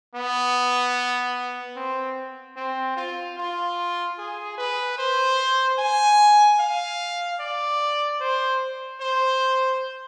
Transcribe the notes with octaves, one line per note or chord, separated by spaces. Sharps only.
B3
C4
C4
F4
F4
G#4
B4
C5
G#5
F5
D5
C5
C5